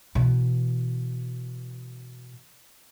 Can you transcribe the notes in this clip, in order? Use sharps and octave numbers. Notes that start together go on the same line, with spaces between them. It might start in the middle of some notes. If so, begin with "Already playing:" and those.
B2 E3